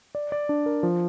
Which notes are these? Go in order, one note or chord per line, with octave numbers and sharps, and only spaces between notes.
D5
D5
D4
A#4
F3